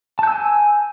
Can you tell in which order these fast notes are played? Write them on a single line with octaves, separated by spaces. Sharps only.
A5 G6 E6 G#5